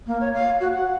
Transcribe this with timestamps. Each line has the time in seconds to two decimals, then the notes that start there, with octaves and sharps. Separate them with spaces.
0.07 A#3
0.21 C#5
0.34 F5
0.60 F#4
0.73 F#5